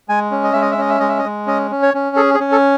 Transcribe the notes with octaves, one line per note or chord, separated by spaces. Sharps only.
G#3 G#5
C#4
D#5
G#3 E5
D#5
E5
C#4 D#5
E5
G#3 D#5
E5
D#5
G#3
C#4 D#5
C#4
C#5
C#4
G#4 A4
G#4
C#4
A4